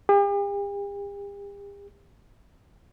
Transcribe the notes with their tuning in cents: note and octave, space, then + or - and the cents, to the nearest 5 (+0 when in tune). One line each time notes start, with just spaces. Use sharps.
G4 +45